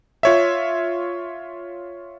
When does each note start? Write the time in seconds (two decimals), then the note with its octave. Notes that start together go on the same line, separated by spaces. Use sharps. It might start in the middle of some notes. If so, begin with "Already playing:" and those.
0.23 F4 C#5 E5